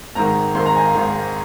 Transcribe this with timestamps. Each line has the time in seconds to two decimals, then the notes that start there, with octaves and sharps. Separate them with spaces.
0.15 G#1 G#2 D#3 A#5
0.55 G#1 G#2 D#3 C6
0.66 A#5
0.76 G#5
0.86 F5
0.95 G#1 G#2 D#3